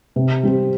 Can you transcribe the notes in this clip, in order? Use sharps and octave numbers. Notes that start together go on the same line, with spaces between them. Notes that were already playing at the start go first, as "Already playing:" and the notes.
C3
G3 C4 G4